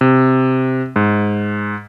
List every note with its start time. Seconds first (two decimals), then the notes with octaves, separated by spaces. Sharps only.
0.01 C3
0.96 G#2